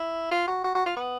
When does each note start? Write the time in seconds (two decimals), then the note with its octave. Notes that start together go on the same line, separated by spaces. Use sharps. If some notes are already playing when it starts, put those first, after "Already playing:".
Already playing: E4
0.31 F4
0.48 F#4
0.64 F#4
0.75 F#4
0.86 F4
0.97 B3